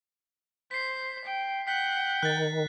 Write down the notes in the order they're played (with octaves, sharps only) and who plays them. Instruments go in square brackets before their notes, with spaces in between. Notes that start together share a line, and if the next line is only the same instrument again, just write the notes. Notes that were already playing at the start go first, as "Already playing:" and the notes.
[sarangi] C5 [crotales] B6 C7
[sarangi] G5
[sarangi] F#5 [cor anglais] G5 [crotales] B6
[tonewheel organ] D#3 [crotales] F#6 A6